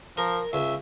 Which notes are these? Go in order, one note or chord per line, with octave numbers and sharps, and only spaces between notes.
F3 A#4
C#2 E5